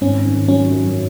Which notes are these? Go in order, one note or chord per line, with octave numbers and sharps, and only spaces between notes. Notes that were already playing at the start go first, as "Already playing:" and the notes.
G#1 C#4
D#3
F#3 C#4
F#2